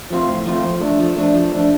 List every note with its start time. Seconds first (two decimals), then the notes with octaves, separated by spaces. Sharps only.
0.10 F3 A3 C4 F4
0.28 A2
0.46 F3 A3 C4 F4
0.64 F3
0.81 A3 D4
0.99 F3
1.17 A3 D4
1.34 F3
1.51 A3 D4